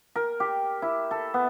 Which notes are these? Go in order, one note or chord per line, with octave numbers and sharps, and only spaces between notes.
A#4
G4
E4
A4
B3